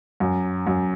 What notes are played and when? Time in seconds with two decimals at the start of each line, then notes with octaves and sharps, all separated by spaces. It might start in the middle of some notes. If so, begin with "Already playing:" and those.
0.20 F#2
0.67 F#2